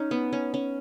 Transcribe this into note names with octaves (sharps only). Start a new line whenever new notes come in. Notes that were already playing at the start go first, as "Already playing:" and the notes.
Already playing: C#4 D#4
B3
C#4
C#4